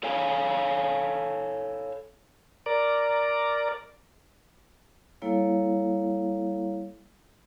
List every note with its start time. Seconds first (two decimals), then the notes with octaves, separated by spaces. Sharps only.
0.03 A4 C#5 F5 G#5
2.66 A#4 D5
5.22 G3 A#3 E4 A4 C#5 F5